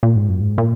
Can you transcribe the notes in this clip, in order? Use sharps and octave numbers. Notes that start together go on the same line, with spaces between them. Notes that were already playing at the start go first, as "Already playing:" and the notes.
A#2
G#2
F#2
G#2
A#2